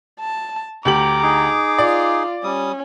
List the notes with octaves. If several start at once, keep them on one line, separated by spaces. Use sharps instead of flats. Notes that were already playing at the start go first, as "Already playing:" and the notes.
A5
D2 G4 A#5 D6 F#7
D#4 G#4
F4 D5
G3 C#4 D#6